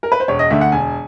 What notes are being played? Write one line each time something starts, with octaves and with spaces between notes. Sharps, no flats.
A#4
B4
C5
E1 C#5
D#5
D2 D3 E5
F#5
E1 G#5